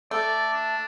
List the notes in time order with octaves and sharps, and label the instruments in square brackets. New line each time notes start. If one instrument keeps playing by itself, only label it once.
[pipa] A3 [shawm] D5
[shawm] D4